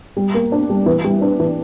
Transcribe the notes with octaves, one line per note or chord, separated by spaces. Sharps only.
G3
A#3
D4
G3
E3
G3
D4
E3